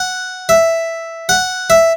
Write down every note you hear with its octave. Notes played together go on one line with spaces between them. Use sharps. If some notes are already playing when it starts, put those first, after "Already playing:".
Already playing: F#5
E5
F#5
E5